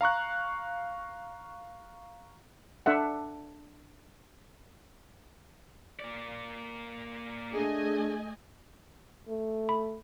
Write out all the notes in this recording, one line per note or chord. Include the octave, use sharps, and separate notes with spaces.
F5 A#5 C#6 F#6
D4 A4 E5 F#5
A#3 D5
A3 D4 G#4 D#5 G#5
A3
B5